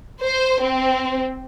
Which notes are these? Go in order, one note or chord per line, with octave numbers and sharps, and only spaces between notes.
C5
C4